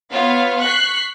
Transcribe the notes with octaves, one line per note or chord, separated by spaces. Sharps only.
B3 F4 C#5 F5
C#6 F#6 B6 C7